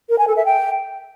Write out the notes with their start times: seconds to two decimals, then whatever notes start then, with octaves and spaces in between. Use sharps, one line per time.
0.09 A#4
0.18 G#5
0.27 A4
0.37 E5
0.46 G5